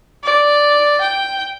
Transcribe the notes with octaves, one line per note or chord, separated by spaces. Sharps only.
D5
G5